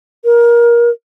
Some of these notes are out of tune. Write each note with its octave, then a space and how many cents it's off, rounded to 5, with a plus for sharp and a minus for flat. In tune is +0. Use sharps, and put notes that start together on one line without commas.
A#4 +20